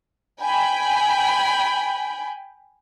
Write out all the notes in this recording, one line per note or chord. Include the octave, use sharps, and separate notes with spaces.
G5 G#5 B5